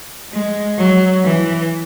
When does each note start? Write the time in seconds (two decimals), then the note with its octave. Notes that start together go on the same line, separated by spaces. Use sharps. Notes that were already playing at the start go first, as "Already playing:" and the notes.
0.32 G#3
0.78 F#3
1.23 E3